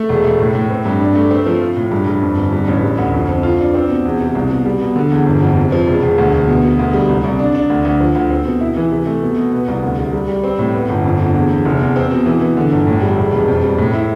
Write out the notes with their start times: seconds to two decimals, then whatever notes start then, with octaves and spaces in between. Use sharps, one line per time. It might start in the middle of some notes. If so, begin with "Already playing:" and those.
Already playing: A3
0.09 E1
0.25 A3
0.40 A2
0.55 A2
0.70 C4
0.86 G2
1.01 D4
1.15 A3
1.31 C4
1.46 F3
1.62 F4
1.77 A2
1.91 G2
2.07 G2
2.22 F2
2.37 G1
2.53 G2
2.68 A1
2.83 G3
2.98 D2
3.14 F2
3.28 F2
3.43 F4
3.59 D4
3.74 C4
3.89 B2
4.05 E2
4.20 C3
4.35 C2
4.50 B2
4.66 G3
4.81 B2
4.96 D3
5.11 E2
5.26 G1
5.42 F2
5.57 C3
5.72 F3
5.87 E1
6.03 E1
6.18 D2
6.33 D2
6.48 B2
6.63 B2
6.79 D2
6.94 G3
7.09 C2
7.24 C2
7.39 D4
7.55 D4
7.70 D2
7.85 D2
8.01 F3
8.15 D2
8.30 C4
8.46 B2
8.61 E4
8.77 E3
8.92 C3
9.07 A3
9.22 B2
9.37 B2
9.52 B3
9.68 C2
9.83 D2
9.98 C3
10.13 G3
10.28 G3
10.44 C4
10.59 A2
10.74 B3
10.89 G1
11.04 F2
11.19 D3
11.35 E2
11.50 E2
11.65 F1
11.80 E2
11.96 C4
12.11 B2
12.26 E3
12.41 E3
12.57 D3
12.72 G1
12.87 A2
13.02 G3
13.17 E1
13.32 E1
13.48 F2
13.63 G3
13.78 A2
13.94 E4